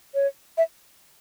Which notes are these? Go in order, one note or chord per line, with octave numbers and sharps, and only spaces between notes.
C#5
E5